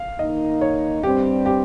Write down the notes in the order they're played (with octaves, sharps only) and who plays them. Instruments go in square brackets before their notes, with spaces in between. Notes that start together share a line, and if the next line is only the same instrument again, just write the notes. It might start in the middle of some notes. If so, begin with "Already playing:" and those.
Already playing: [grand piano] F5
[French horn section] D#3 A#3 D#4 [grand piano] D#5
[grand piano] C#5
[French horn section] G2 G3 C4 [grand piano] G4
[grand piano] G4